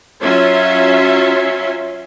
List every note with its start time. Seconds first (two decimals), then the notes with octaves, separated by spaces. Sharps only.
0.22 F#3 C#4 F4 C#5 E5